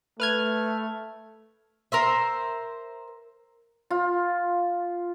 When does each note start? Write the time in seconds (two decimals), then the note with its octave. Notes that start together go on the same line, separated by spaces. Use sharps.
0.20 A3 B4 F6 G#6
1.92 A#4 C5 E5
3.90 F4